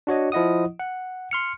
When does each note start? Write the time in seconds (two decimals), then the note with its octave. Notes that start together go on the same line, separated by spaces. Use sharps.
0.07 D4 F#4 C#5 D#5
0.32 F3 E4 D#5 F#5 D#6
0.80 F#5
1.31 C6 F6 C#7